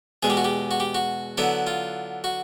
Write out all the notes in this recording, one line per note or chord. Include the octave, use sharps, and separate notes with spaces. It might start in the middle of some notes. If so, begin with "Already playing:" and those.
E2 B2 G#3 G#4
G4
F#4
G4
F#4
G4
F#4
D3 F#3 B3 E4
F4
F#4